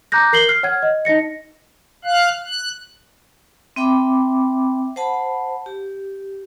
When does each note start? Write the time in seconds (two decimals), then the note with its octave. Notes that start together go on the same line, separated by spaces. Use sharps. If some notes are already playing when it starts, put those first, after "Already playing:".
0.12 A#5 D6 F#6 G6 A#6
0.33 A#4 C7 F#7 G7
0.48 F6 F#6 C7
0.63 C#5 F#5 F6 G#6
0.83 D#5
1.05 D#4 D#5 A#6 C#7
2.04 F5 F#6
2.44 F#6
3.76 C4 E5 G5 B5 D6
4.96 C5 F#5 A5 B5
5.66 G4